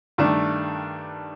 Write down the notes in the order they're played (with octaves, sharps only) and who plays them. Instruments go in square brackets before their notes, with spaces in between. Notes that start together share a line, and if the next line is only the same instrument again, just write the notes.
[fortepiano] G2 D#3 A3 D4